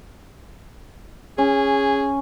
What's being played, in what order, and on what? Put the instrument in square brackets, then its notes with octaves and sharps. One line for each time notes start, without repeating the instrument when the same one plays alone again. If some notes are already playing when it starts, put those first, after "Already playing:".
[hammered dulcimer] C#4 [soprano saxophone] G#4